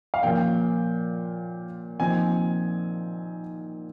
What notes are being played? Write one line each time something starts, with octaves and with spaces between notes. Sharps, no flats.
F5
A#2 F3 A#3 C#4 F4 G5
A#2 F3 C4 D#4 G#5